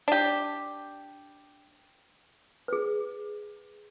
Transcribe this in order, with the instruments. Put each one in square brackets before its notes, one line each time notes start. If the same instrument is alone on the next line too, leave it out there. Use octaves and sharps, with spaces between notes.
[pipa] D4 G4
[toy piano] G#4 B4